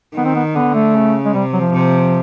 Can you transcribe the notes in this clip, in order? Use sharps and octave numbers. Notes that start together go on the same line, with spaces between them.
D#3 B3
C4
B3
D3 B3
A3
C#3
G#3
C3 G3
F#3
F3
C3